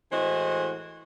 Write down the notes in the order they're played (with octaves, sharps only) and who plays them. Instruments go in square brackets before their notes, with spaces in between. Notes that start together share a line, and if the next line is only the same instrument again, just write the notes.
[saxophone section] A2 E3 G#3 F#4 C5 D#5